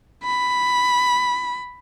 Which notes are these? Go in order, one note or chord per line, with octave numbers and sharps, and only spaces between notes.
B5